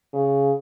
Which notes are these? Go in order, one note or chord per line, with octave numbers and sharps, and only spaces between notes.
C#3